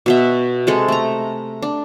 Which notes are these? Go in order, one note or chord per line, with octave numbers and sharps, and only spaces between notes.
B2 F#4 E5
C3 G#3 A4
A3 A#5
D4